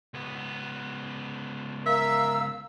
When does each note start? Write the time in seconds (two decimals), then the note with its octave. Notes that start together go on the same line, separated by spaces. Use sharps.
0.14 C#2 B3
1.86 A#4 E5 F5 E6